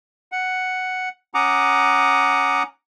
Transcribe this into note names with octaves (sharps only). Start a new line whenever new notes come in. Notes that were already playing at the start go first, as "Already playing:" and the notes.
F#5
C#4 F#5 A#5 D6 D#6